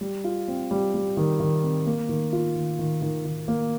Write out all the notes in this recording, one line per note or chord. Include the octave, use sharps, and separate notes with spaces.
G3
F4
C4
G3
G3
D#3
D#3
C4
A#3
D#3
F4
D#3
D#3
D#3
D#3
A#3